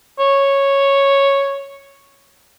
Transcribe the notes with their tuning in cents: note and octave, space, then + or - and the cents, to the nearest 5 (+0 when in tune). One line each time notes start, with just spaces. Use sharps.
C#5 -5